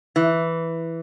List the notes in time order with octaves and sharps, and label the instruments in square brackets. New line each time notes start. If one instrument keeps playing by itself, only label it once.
[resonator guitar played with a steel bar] E3